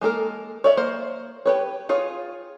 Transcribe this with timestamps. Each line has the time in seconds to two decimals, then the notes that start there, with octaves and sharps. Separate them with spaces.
0.01 G#3 A#3 A4 A#4
0.64 C#5 D5 E5
0.77 A#3 C5
1.46 G4 B4 C#5
1.89 F4 G#4 C#5